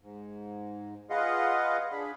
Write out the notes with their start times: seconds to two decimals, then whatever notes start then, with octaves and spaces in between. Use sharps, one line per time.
0.01 G#2
1.10 F4 G#4 B4 D#5 F5 F#5
1.91 D4 G#4 B5